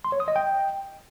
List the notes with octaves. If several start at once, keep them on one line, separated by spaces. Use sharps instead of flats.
C6
C#5
D#6
D#5
G5